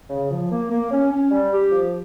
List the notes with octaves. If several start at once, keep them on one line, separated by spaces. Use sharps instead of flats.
C#3
F3
A#3
A#3
C#4
C#4
G3
G4
F3